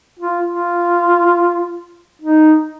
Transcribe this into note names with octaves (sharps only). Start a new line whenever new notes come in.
F4
F4
D#4